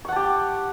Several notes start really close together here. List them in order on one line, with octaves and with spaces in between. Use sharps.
C#6 F#5 A5 G4